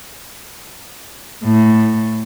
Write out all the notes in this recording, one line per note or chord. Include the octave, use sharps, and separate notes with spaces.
A2